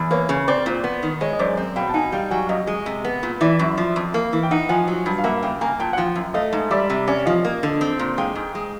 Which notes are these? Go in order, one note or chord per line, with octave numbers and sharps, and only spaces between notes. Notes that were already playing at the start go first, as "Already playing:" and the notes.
Already playing: E2
A#3 B4 C#5
C#3
C4 C5 D5
A#2
B3
D#3
G#3 C#5 D#5
D#5
F#2 C5 D5
C4
B2 F5 G5
A5
D#4 F#5 G#5
G3 F5 G5
F#3 F#5 G#5
F#2 D#5 F5
G#3
C3
B3
A#2
E3 D5 E5
F#2
F3
F2
A#3
E3
G5
D#4 E5 F#5
F3 F#5 G#5
F#3
G2
F5
A#3 E5 F#5
C#3 F5 G5
A#3 G#5 A#5
A#2 G5 A5
F#5
F3 F5 G5
F#2
A3 D#5 F5
G#2
G3 D5 E5
C3
C#4 D5 E5
F3 D#5 F5
A#3
D3
C4
A#2
G#3 F5 G5
G#2
G#3